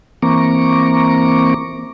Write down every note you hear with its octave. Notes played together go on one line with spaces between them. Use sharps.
E3 A#3 C4 A#5 C#6 D6